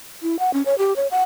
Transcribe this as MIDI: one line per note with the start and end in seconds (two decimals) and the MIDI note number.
0.22 0.39 64
0.39 0.53 78
0.54 0.62 61
0.66 0.75 73
0.78 0.93 67
0.96 1.07 73
1.11 1.23 78